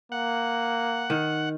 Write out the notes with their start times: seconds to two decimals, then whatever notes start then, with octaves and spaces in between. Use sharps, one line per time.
0.12 A#3 F#5
1.10 D#3